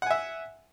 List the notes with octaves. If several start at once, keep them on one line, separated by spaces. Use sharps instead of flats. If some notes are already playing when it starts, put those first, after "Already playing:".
E5 F#5 G#5